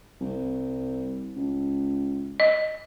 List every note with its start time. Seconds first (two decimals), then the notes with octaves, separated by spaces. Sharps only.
0.21 C2
1.36 C#2
2.40 D#5